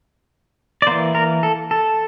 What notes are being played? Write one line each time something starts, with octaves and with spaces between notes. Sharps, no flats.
D5
E3 A#3 C5
A#4
A4
A4